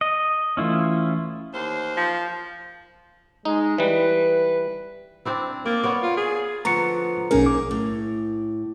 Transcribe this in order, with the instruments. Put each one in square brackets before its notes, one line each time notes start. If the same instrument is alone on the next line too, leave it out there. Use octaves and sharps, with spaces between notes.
[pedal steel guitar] D#5
[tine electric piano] E3 A3 D#6 [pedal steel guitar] C#4 E4 F4
[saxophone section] D#2 C5
[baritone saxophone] F3
[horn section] G#3 [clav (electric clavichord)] D#4
[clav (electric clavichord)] E3 G3 [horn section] B4
[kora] C4 D4 E4
[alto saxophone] A#3 [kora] D5
[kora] B3 C#5 D5
[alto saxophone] F4
G#4
[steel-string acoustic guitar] D3 F3 B3 [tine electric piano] A#5 C#6 C#7
[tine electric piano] B1 C#4 A#4 [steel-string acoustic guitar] A#3 D#4 G#4
[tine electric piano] D6
[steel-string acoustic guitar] A2